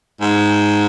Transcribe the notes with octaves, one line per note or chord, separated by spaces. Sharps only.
G#2